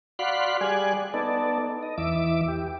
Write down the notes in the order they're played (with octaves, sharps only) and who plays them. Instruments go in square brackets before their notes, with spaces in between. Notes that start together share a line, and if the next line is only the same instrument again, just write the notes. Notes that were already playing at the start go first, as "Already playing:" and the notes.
[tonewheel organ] F#4 D5 F5 B5 C6 F#6
G3 G#4 D5 G#5 F#6
B3 D#4 A4 D5
D#5
E2 E3 E5 D6
G4